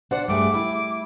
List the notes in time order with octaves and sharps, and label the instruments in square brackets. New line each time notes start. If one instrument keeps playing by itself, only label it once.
[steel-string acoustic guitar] D4 C5 D5 [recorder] F#5
[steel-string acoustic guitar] G2 A3 G#4 [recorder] D6
[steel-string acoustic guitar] E4